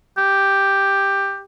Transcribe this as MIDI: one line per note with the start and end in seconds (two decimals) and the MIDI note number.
0.18 1.41 67